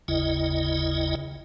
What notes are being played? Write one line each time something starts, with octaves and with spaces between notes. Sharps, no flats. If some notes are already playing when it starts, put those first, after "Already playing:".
G1 D#2 C#3 E4 D#5